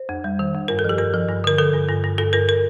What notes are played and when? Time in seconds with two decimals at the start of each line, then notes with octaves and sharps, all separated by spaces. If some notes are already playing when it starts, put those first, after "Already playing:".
Already playing: C5
0.09 F2
0.24 G3
0.39 D#3
0.54 F2
0.68 G2 A#4
0.79 A4
0.84 F3 G4
0.98 G2 A#4
1.13 F3
1.29 G2
1.44 D3 A#4
1.58 D3 A4
1.74 G2
1.89 G2
2.04 G2
2.18 G2 A4
2.33 G2 A#4
2.49 A#4